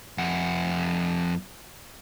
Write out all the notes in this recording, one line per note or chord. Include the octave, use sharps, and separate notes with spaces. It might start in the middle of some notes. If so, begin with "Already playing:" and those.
F2 F#5